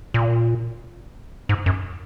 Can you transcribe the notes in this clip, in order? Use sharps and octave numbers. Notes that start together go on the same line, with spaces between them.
A#2
G#2
F#2